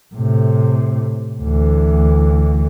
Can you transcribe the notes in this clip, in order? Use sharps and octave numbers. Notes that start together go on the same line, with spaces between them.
A2 C3
D2 E3